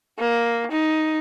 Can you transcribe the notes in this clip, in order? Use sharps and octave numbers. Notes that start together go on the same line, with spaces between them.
A#3
D#4